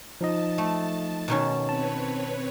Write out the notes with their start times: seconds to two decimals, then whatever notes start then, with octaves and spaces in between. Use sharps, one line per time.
0.21 F3 D#4 D#5 A5
0.58 A3
1.28 B2 D#3 C#4
1.69 C4 B4 C#5 A5